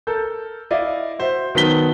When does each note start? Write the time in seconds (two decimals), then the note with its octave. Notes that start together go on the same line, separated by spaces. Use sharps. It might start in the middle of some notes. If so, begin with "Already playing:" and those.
0.07 A4 A#4 G6
0.71 E4 D5 D#5 F5
1.19 F#4 C5 E5
1.55 D#3 F#3 B3 A5 B6 G7